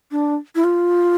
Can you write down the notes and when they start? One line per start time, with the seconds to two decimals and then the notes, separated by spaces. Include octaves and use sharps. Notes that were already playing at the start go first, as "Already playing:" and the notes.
0.11 D4
0.55 E4
0.64 F4